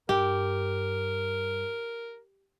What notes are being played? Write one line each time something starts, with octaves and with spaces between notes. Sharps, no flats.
G2 G4 A#4